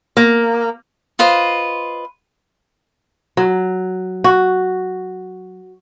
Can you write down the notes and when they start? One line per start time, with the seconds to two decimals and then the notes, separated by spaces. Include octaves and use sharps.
0.17 A#3
1.19 F4 B4 C5 D#5
3.37 F#3
4.24 F#4